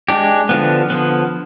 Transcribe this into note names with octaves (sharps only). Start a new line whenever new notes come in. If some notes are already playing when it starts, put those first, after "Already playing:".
G#3 D4 G4
D3 F3 B3
D3 F3 B3